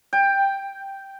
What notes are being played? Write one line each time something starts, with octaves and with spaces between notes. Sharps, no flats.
G5